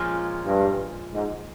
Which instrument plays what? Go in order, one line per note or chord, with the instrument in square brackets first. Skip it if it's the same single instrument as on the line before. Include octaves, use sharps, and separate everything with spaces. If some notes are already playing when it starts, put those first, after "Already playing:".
Already playing: [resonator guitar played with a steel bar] A#2 F3 G#3 C#4 F4
[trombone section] G2
G#2